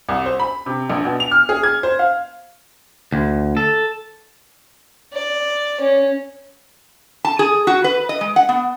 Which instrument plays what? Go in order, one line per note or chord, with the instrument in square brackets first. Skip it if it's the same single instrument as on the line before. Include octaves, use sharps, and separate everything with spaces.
[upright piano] C2
C5
B5
C3
A#1
B2
F7
F6
G#4
G#6
C5
F5
[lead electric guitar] D2
A4
[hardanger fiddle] D5
C#4
[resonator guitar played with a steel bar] A5
G#4
F#4
B4
D#5
G#3
F#5
B3